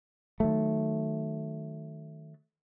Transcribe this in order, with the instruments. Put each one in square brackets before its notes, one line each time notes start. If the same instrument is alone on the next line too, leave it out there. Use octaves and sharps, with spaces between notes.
[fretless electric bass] D#3 F#3 A3